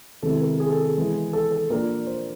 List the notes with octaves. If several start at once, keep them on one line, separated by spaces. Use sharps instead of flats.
C3 D#3 G#3 B3 E4 A4
A#4
G#4
A4
G#4
E3 G#3 B3
A4
A4
A#2 F3 A#3 D4 A#4
C5